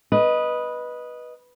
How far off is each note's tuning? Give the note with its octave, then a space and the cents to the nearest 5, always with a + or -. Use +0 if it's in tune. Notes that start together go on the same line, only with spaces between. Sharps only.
B4 -10 D#5 +0